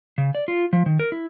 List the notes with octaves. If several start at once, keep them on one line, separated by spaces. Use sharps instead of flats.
C#3
D5
F4
F3
D#3
A#4
E4